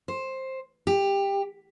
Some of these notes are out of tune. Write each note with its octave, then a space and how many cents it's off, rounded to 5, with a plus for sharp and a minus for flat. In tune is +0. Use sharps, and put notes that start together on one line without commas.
C5 +10
G4 +15